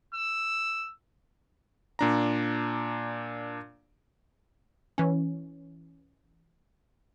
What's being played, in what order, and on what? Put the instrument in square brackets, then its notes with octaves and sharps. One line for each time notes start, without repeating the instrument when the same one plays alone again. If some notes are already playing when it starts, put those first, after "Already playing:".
[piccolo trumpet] E6
[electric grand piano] A#2 D4 A#5
[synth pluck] E3 C#4